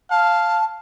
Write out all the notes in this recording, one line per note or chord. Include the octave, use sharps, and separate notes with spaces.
F5 A5